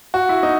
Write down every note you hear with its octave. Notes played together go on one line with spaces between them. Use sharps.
F#4
E4
D#4